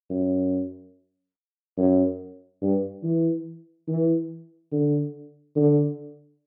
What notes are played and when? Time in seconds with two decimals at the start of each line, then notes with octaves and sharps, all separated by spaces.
0.10 F#2
1.77 F#2
2.62 G2
3.03 E3
3.88 E3
4.72 D3
5.56 D3